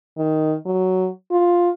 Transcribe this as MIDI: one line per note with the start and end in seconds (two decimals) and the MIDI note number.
0.18 0.56 51
0.66 1.08 54
1.31 1.71 65